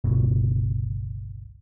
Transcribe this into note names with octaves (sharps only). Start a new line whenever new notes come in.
G1 C#2 B2